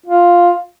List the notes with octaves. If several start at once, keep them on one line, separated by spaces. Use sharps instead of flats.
F4